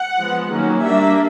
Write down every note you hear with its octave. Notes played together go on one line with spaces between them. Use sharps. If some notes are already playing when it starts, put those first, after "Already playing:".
Already playing: F#5
F3 G#3 B3
D#3 F#3 A#3 C#4
G3 A#3 D4 E5